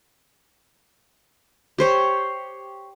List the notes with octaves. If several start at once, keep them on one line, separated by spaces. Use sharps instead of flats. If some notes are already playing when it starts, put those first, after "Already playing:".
G4 C5 C#5